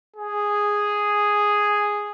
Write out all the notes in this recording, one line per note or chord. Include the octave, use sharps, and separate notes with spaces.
G#4